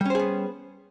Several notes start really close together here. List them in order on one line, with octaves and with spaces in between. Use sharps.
G3 C#4 C5 G#4 B3